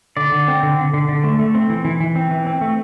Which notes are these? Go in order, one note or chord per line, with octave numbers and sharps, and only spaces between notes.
D3 D5
D3
C4
D3
D3
D3
D3
A3
A3
C4
E3
E3
E3
C4
E3
C4
A3